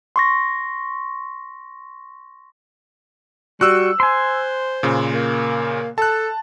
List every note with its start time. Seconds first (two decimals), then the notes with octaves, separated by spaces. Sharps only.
0.16 C6 C#6 A#6
3.61 G3 F#4 E6 F#6
4.00 C5 G#5 C6
4.83 A#2 C#3
5.12 A#3
5.98 A4 A5 F#6